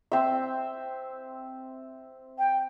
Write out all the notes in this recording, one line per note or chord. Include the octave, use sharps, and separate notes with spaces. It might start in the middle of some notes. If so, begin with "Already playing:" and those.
C4 E5
G5